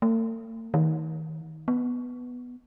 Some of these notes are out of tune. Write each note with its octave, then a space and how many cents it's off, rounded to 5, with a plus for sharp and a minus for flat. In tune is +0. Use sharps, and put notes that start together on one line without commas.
A3 +45
D#3 +30
B3 +0